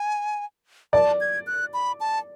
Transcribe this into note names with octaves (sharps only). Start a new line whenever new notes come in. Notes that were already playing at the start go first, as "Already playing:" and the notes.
Already playing: G#5
D5 A5
G#6
F#6
B5
A5